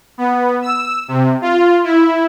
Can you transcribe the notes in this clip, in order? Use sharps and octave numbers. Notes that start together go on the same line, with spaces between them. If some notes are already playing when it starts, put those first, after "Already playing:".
B3
E6
C3
F4
E4